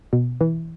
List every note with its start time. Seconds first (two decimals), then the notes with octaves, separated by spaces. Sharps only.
0.13 B2
0.41 E3